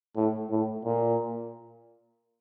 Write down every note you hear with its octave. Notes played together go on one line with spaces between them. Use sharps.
A2
A2
A#2